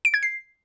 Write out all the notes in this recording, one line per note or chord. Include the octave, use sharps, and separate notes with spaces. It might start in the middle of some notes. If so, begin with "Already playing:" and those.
D7
G#6
C7